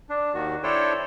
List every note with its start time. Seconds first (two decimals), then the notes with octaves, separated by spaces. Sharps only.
0.09 D4
0.34 D#2 D#3 F#4
0.63 D4 E4 A4 C5 C#5 G5